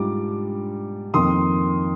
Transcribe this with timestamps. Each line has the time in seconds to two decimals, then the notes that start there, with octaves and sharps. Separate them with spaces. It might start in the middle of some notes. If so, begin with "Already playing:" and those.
Already playing: G#2 G3 D4 F4 D6
1.14 F2 D#3 A#3 C6 D#6